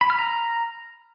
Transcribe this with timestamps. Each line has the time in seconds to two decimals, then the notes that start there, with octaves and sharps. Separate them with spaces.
0.01 B5
0.10 F6
0.19 A#5